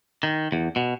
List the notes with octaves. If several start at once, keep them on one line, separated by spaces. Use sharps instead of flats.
D#3
E2
B2